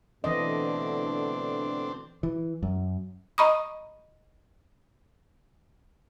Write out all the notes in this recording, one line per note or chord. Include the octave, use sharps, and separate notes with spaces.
B2 D3 E3 A3 C4 D4 D#5
E3
F#2
D#5 A#5 B5 C#6 D#6